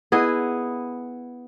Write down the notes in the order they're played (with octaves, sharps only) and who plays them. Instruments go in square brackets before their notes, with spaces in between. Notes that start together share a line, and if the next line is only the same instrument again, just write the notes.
[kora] B3 E4 G#4 D#5